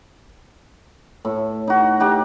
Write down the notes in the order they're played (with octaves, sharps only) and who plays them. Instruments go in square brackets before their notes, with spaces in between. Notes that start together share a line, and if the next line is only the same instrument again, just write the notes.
[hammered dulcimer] A2
D#4 F#4
D#4 G4 F#5